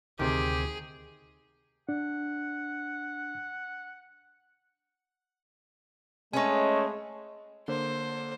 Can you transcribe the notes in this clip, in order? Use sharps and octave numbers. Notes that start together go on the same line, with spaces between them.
D2 C3 D#3 G4 G#4
D4 F#5
G#3 A3 C#4 B4 C#5 D#5 G#5
D3 A#3 C5